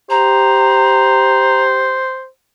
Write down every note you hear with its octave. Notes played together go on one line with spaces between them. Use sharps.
G4 C5 A#5